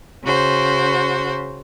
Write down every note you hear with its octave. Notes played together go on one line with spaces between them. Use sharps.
C#3 F#4 C5